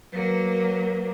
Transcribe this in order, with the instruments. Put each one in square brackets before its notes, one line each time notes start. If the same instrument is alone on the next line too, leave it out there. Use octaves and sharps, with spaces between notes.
[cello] F#3 A#3 [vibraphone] A#4 B4